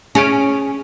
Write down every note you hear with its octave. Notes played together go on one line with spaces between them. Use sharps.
C#4 G#4 D7